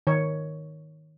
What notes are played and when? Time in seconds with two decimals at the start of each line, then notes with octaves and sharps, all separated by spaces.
0.07 D#3 C#5